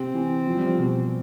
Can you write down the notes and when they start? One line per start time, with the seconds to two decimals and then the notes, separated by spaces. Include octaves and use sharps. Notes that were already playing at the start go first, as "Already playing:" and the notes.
Already playing: C3 C4
0.14 E3
0.47 F3
0.57 G3
0.66 F3
0.79 B2